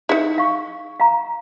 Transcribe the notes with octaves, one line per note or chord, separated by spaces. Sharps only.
D#4 E4 G#4
F5 C#6
F5 A#5